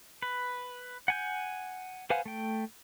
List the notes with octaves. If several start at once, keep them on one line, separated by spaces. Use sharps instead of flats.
B4
F#5 G#5 G6
B4 C5 F5 F#5 G#5
A3 G5